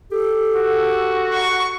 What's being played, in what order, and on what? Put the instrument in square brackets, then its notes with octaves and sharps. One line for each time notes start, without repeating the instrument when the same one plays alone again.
[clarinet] G4 [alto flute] A4
[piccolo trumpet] F#4
[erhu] C#6